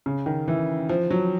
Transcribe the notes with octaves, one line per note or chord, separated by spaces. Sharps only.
C#3
D#3
E3
F3
F#3